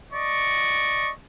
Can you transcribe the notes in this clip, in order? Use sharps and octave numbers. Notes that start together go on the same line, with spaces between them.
D5 D#5 C#6